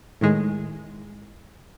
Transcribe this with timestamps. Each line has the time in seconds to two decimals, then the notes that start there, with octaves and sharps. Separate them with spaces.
0.21 A2 D#3 G#3